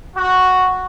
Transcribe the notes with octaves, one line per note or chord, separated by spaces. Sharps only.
F#4